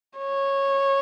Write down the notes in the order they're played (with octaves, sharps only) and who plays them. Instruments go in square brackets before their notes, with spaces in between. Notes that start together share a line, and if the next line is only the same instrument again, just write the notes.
[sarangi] C#5